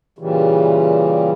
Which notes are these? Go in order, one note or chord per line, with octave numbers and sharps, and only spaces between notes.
A#2 C#3 E3 G3